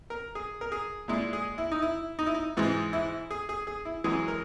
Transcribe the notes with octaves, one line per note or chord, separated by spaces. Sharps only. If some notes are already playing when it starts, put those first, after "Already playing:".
A#4
G#4
A#4
G#4
A#2 G#3 E4
G#4
E4
D#4
E4
D#4
E4
D#4
G#2 E3 G#3
E4
G#4
G#4
G#4
E4
F#2 E3 G#3 G#4
A#4